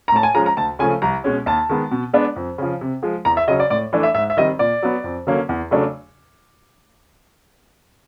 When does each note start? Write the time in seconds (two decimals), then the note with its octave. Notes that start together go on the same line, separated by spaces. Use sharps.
0.08 A#5
0.12 A2 A5
0.23 G#5
0.34 F3 G#3 C#4 A#5
0.46 A#5
0.57 D2 A5
0.79 C#3 F3 A3 G#5
1.02 C2 A#5
1.24 B2 G#3 C#4
1.46 D#2 A5
1.69 D#3 G#3 B3
1.91 B2
2.13 G#3 B3 D4
2.36 F2
2.58 C#3 F3
2.81 C3
3.03 F3 G#3
3.25 E2 A#5
3.37 E5
3.48 C#3 F#3 D#5
3.60 D5
3.70 A2 D5
3.93 E3 A3 D4
4.03 E5
4.14 G#2 E5
4.30 E5
4.37 D#3 G3 C4 D#5
4.59 A#2 D5
4.83 F#3 B3
5.04 F2
5.27 D3 F#3 A#3 C#4
5.49 E2
5.71 C#3 F#3 A3 D4